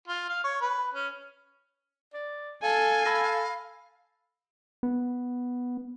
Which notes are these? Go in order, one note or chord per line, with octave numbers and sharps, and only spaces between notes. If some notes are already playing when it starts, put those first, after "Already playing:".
F4
F5
C#5
B4
C#4
D5
A4 F5 G#5
A4 B5 E6 A#6
B3